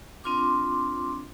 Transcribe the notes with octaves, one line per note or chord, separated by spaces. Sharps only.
C4 D4 F4 C6 D6